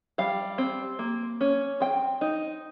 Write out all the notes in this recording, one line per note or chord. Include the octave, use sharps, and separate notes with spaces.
G3 F5
C4
A#3
C#4
C4 G5
D#4